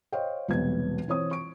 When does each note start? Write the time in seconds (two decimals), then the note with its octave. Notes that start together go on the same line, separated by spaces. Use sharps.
0.13 C5 C#5 D#5 F5 G5
0.48 E1 B1 C3 G3 B4 G#6
1.08 E3 C4 C#5 D#6
1.31 C#6 D7